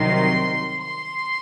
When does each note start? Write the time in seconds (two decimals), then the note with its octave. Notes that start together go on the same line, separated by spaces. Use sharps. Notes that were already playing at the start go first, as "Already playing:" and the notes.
Already playing: C2 C3 D#3 F#3 C6
0.81 C6